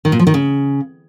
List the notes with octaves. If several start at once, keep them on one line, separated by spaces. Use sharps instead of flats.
D#3
A#2
F3
D#3
C#3